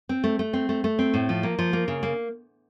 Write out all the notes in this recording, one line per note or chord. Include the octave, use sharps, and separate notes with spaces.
C4
A3
A3
C4
A3
A3
C4
A2
F3
A#3
F3
A#3
C#3
A#3